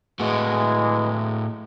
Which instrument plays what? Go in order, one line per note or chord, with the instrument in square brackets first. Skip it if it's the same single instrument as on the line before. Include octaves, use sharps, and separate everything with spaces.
[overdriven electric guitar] A2 F#4 [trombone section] E3 G#3